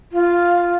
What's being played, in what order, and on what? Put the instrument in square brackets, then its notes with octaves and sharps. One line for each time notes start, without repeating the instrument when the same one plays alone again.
[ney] F4